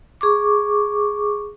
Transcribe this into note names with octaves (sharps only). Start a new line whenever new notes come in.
G#4 C#6 D6